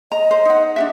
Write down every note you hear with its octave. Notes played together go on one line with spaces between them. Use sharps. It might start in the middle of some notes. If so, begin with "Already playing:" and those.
D#5 A#5
C5
D#4 F#5
D4 F#4 E5